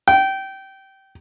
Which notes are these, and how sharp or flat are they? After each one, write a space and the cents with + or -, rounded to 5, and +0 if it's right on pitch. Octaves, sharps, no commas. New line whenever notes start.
G5 -20